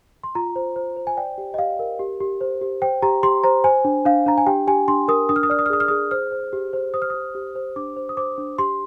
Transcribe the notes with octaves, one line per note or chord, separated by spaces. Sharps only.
C6
F4 A#5
C5
C5
C5
G#5
D5 G5
G4
D#5
G4 F5
A#4
G4
G4
C5
G4
C5 G5
G4 A#5
G4 C6
C5 A#5
C5 G#5
D4
D4 F5
D4 A#5
G#5
G4 G5
G4 G#5
D4 C6
A#4 D#6
D4 D#6
F6
D#6
D5 F6
D#6
F6
G#4 D#6
F6
G#4 D#6
C5 F6
C5
G4
C5
C5 D#6
F6
G4 D#6
G4
C5
D4 D6
C5
D#6
C5 D6
D4
G4 C6